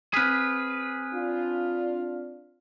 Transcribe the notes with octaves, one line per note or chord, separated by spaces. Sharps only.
C4 G#4 B4 F6 B6
D4 F4